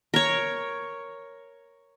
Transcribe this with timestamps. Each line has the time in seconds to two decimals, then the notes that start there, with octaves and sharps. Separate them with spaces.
0.14 A#4 C#5